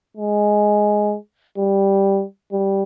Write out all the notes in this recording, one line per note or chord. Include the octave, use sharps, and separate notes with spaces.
G#3
G3
G3